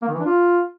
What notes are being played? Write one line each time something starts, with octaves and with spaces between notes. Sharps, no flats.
A#3
D#3
E3
D4
F4